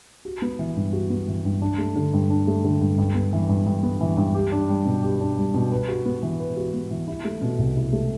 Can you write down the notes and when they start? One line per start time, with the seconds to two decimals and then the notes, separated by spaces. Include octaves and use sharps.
0.25 F#4
0.42 B3
0.59 E3
0.76 G2
0.93 F#4
1.10 B3
1.28 E3
1.45 G2
1.62 D4
1.78 A3
1.96 D3
2.13 G2
2.30 D4
2.47 A3
2.64 D3
2.81 G2
2.98 G2
3.15 B3
3.33 E3
3.49 G2
3.66 G2
3.83 B3
4.01 E3
4.17 G2
4.34 G4
4.52 D4
4.69 G3
4.85 B2
5.03 G4
5.21 D4
5.38 G3
5.54 B2
5.72 B4
5.88 F#4
6.05 B3
6.23 E3
6.40 B4
6.57 F#4
6.74 B3
6.91 E3
7.08 E4
7.25 A3
7.41 B2
7.59 C2
7.77 E4
7.93 A3